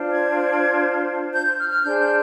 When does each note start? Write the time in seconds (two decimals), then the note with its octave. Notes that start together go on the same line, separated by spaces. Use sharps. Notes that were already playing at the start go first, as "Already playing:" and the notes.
Already playing: D4 F4 C5
0.11 G#6
1.33 G6
1.46 G6
1.58 F6
1.70 F6
1.82 D4 G#4 C5 G6
1.99 G6